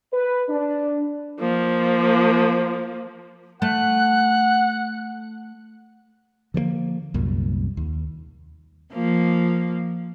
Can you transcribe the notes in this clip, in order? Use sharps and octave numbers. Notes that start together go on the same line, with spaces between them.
B4
D4
F3 A#3
A3 F#5 F#6
D3 F3 G3 A#3
C2 F#2 A#2
D#2
F3 A#3